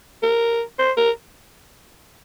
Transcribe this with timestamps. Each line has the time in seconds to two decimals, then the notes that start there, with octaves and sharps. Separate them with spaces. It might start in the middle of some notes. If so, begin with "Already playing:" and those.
0.23 A#4
0.79 C5
0.98 A#4